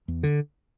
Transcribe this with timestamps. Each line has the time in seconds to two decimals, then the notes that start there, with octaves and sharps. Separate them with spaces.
0.08 E2
0.23 D3